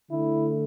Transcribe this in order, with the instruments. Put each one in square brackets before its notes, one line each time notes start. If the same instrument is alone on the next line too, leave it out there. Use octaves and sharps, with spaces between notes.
[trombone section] D3 A3 E4